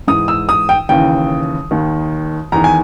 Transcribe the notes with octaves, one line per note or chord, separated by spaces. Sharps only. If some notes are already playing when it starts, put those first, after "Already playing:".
G#2 E3 D#6
E6
D#6
G5
D#2 C#3 E3 G5
D#2 D#3
E2 D#3 A#5
G#5